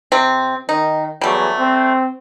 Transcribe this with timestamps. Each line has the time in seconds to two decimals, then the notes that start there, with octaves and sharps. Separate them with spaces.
0.12 C3 C4
0.69 D#3 D#4
1.21 E2 E3 F#3 G3 A3
1.59 C4